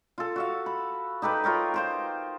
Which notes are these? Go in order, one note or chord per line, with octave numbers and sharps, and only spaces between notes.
F4 A4
F#4 E5 F5
B5
D#4 G4 A4 B4
F4 A#4 C#5 G5
F4 C5 G5